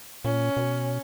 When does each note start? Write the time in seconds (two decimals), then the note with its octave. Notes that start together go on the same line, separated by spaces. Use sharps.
0.25 A#2 C#4
0.57 B2